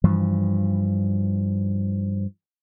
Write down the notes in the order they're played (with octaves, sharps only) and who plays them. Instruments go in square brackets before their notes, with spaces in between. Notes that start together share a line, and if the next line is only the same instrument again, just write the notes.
[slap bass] G2 E3 F3